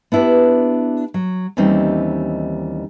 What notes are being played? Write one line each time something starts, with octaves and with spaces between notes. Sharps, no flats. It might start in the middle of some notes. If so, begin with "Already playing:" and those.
B3 D4 E4 G4 B4
F#3
D#2 E3 G3 C4 C#4 D#4